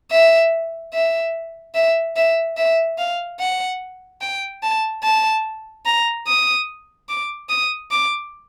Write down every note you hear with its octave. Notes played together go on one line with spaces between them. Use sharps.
E5
E5
E5
E5
E5
F5
F#5
G5
A5
A5
A#5
D#6
D6
D#6
D6